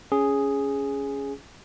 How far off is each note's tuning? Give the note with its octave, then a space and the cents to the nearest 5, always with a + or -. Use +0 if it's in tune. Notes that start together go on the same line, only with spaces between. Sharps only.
C#4 +10 G#4 +0